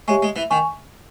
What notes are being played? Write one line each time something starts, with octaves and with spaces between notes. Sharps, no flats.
G#3 G4 C#5 E5 G#5 C#6
G#3
E3
D#3 G#5 C#6